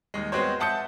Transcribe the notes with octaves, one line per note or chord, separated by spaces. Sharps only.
D#2 G#3
G#3 B3 C4 F#4 C5 C#5
E5 F#5 A5 D#6 G6 C#7